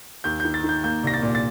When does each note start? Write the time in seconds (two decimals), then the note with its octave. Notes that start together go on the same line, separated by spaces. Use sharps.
0.24 D#2 G6
0.40 G6
0.45 D#3
0.54 A6
0.64 D#3
0.69 G6
0.84 A#3 G6
1.03 C2 A#6
1.14 A6
1.22 A#2
1.35 A6